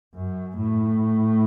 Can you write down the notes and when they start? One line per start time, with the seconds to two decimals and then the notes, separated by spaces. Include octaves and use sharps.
0.15 F#2
0.56 A2